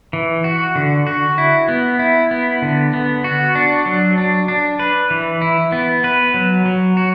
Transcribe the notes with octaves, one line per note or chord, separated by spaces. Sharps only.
E3
F#4
D3
F#4
E4
B3
E4
B3
D3
B3
F#4
D4
F#3
D4
D4
B4
E3
E4
B3
B4
F#3
F#3
F#4